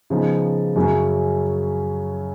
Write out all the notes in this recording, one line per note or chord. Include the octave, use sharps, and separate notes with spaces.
C#3 F3 B3 D#4
F#2 C#3 F#3 C#4